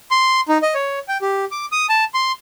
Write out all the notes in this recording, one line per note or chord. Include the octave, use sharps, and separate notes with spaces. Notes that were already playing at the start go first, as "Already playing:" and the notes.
C6
D#4
D#5
C#5
G5
G4
D6
D#6
A5
C6